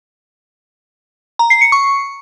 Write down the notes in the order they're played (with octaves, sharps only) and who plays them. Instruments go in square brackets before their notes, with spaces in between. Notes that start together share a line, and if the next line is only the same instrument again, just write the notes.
[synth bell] A#5
C7
C#7
C#6